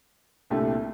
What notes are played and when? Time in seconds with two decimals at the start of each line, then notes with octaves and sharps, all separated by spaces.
0.50 C2 A#2 A3 D4 G4